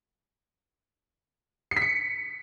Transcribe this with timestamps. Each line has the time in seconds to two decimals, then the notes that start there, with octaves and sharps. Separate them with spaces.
1.71 C7
1.77 B6
1.82 C#7